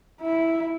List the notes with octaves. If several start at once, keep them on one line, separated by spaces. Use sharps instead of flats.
E4